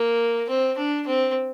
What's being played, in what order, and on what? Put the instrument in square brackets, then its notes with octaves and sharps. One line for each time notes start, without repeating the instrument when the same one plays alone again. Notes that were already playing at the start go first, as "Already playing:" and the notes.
Already playing: [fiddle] A#3
C4
D4
C4